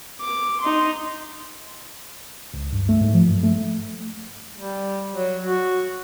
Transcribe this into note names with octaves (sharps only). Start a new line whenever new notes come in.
D6
D#4 C6
C#2
G2
A3
G#2
F3
G2
A3
G3
F#3
F#4